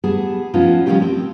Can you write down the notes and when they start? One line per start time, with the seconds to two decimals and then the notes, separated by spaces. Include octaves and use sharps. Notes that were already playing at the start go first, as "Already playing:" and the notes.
0.04 G3 B3 G#4 A5
0.54 F3 B3 C#4 D#4 F4
0.86 D#3 F3 G3 A3 C#4 G4
1.02 C4